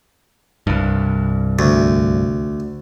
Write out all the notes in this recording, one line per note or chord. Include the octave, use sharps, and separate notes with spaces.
C2 G2
D2